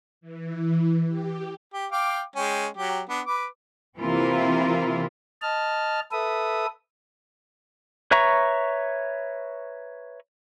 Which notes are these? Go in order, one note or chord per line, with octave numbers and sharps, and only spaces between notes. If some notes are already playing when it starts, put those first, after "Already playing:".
E3
G4
G4
F5 G5 D6
G#3 C#4 G5
F#3 G4
B3 D4
B4 D6
C3 E3 A#3 C4 E4 F4
D#5 A5 F6
A4 B4 E5 D#6
B4 C#5 E5 A#5 C#6